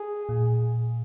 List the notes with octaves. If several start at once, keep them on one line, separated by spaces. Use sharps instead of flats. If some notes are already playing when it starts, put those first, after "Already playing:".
Already playing: G#4
A#2